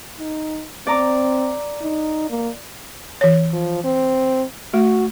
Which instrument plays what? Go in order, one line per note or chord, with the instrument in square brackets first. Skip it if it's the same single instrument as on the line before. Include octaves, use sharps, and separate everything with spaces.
[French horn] D#4
[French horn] C4 [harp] D5 A#5 D6
[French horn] D#4
A#3
[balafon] E3 C#5
[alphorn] F3
C4
[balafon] A3 [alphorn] F#4